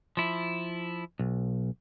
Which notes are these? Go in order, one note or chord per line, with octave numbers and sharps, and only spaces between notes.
F3 E4
B1